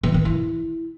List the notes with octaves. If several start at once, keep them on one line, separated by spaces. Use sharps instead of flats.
E3
D#3
E4